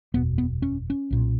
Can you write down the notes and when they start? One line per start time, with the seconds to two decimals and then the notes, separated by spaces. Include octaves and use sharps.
0.14 F#1 E2 B2 B3
0.38 B3
0.62 C#4
0.90 C#4
1.10 B1 A#2